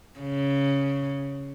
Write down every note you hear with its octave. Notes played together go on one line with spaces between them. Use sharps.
C#3